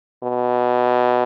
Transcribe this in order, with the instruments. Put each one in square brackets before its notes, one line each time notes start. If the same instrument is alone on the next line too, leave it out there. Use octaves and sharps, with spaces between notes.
[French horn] B2